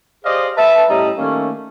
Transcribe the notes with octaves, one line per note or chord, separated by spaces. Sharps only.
G4 G#4 C5 D5 D#5 F5
B4 E5 A5
A2 G3 C#4 D#5 A#5
D#3 A3 A#3 C#4